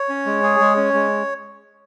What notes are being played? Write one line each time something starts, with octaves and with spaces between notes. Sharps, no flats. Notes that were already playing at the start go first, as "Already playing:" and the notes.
Already playing: C#5
C#4
G#3
G#4
G#3
C#4
G#3